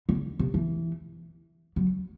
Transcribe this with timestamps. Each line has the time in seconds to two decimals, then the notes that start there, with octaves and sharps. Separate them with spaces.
0.09 D3
0.39 C3
0.54 E3
1.76 F#3